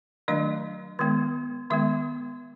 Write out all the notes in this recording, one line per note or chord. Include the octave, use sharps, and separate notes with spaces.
D#3 F#3 A3 D4 D#5
D#3 G#3 B3
D#3 G#3 B3 E5